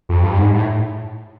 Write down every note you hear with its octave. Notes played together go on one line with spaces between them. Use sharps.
F2
G2
G#2
A2